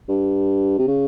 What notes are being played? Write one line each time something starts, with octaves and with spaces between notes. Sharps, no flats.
G2
C3
C#3